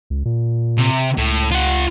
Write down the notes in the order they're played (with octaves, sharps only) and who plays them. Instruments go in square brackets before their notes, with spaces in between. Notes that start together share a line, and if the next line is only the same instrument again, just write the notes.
[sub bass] C#2
A#2
[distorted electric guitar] C3
[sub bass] C#2 [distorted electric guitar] A2
[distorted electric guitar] F4 F#5